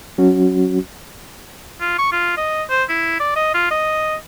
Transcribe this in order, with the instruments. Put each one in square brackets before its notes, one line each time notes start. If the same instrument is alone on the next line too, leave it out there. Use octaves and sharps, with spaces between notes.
[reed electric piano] F#3 C#4 F#4
[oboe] F4
C#6
F4
D#5
C5
E4
D5
D#5
F4
D#5